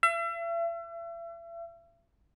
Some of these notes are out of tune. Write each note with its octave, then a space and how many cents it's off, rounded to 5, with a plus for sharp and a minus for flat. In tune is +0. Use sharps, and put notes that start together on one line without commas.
E5 +40